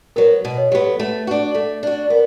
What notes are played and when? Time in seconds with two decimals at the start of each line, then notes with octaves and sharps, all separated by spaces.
0.16 F#3 B3 A#4
0.45 B2
0.57 C#5
0.71 F#3 B3 G4
0.86 A4
1.00 A3
1.27 D4 F#4
1.55 A3 A4
1.83 D4 F#4
2.10 B3 A#4